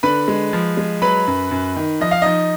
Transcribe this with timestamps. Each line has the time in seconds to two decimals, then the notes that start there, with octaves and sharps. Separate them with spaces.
0.03 D3 B4 B5
0.28 G#3
0.53 F3
0.77 G#3
1.02 F#3 B4 B5
1.27 F#2
1.51 F#2
1.76 D#3
2.01 F3 D#5
2.11 F5
2.22 F3 D#4 D#5